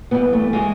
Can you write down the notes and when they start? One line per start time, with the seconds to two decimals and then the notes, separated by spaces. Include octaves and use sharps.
0.11 G2 E3 B3
0.33 A3
0.53 E3 G#3